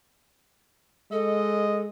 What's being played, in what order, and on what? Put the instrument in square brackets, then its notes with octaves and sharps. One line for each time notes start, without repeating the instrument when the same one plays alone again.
[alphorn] G#3 [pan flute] A4 [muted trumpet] D#5